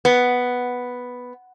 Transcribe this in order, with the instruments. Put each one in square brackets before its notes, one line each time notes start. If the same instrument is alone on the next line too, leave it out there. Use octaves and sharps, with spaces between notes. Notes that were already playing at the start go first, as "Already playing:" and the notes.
[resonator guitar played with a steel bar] B3